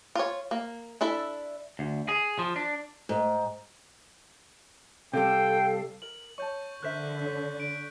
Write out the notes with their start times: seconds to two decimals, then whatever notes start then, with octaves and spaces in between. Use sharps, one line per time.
0.15 F4 C#5
0.51 A#3
1.01 D4 E4 A4 E5
1.79 D2
2.09 G#4
2.39 F3
2.56 D4
3.09 G#2
5.14 C3 G3 A4 F5 G5
6.02 A#4 F#7
6.38 C#5 A5 C#6 G6
6.83 D3 A#4 C5 E5 F#6 G6 B6
7.26 C#5
7.60 D7